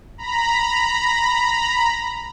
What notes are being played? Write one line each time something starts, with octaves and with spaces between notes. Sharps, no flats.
A#5 B5